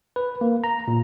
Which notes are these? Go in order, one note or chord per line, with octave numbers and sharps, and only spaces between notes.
B4
A#3
A#5
A#2